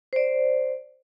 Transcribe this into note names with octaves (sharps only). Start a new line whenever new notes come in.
C5 D5